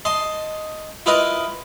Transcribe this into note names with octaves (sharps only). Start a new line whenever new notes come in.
D#5 A5 C6
E4 F4 A#4 B4 D#5